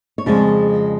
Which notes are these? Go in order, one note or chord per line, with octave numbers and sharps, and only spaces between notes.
C#5
F2 C#3 F3 G#3 D5